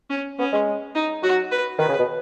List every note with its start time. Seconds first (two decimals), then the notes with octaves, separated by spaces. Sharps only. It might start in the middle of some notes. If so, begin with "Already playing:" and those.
0.10 C#4
0.39 B3 C#4
0.53 G#3
0.95 D#4
1.23 F#3 F#4
1.52 B4
1.79 D#3 B4
1.89 C#3
1.98 B2